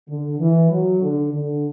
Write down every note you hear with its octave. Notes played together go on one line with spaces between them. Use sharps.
D3
E3
F#3
D3
D3